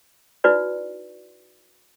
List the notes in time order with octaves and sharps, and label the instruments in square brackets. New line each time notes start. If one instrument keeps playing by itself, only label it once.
[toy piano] D#4 E4 F#4 B4 D5